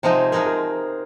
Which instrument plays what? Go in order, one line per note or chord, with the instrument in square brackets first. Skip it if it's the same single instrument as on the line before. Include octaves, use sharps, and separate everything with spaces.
[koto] C3 F3 G#3 D#4 G#4 [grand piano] C5
[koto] C3 F3 G#3 D#4 G#4 [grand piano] A#4
[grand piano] A#4